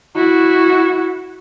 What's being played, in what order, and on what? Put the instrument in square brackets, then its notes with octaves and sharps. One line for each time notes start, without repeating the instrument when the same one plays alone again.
[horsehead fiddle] E4 F#4